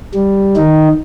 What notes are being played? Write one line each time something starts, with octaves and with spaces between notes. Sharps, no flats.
G3
D#3 D#4